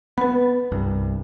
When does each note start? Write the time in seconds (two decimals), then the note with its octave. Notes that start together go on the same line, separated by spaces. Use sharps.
0.18 B3 B4 B5
0.72 C2 G2